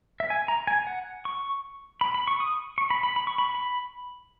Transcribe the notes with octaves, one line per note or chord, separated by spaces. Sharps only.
E5
G#5
A#5
G#5
F#5
C#6
B5
B5
C#6
D#6
C#6
B5
B5
B5
C#6
B5
B5